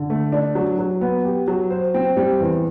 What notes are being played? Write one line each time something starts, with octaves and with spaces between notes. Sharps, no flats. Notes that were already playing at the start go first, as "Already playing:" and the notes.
Already playing: D3
A3
D4
F#3
F#3
B3
G4
F#3
C5
C4
G3
E2